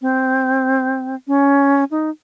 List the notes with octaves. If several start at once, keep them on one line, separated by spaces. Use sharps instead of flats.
C4
C#4
D#4